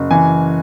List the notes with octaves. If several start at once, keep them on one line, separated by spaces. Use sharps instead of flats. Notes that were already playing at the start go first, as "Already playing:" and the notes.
Already playing: F#1
E3 G#5